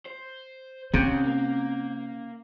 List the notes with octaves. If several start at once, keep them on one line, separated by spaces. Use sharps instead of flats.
C5
C3 D#3 C4 C#4 C#5 G6
A#3